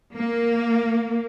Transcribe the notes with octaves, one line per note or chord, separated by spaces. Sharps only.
A#3